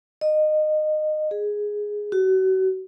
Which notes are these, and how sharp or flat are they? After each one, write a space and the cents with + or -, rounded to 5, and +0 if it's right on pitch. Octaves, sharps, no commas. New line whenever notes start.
D#5 -20
G#4 +0
F#4 +35